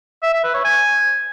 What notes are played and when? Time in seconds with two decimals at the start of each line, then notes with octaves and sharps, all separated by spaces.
0.23 E5
0.33 E5
0.44 B4
0.54 C#5
0.65 G#5